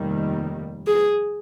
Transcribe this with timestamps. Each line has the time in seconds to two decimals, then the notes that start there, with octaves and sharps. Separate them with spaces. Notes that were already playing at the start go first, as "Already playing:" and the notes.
Already playing: F1 D#2 D#3 G3
0.87 G#4